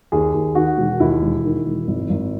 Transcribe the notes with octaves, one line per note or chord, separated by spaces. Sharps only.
D#2 G#4
D#2
D#3 F#4
E1
D#2 E4
E1
D#3
E1
G#1
G#1